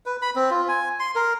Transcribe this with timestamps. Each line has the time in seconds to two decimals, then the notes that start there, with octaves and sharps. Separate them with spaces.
0.06 B4
0.22 B5
0.36 C4
0.50 F4
0.68 G#5
1.00 C6
1.16 A#4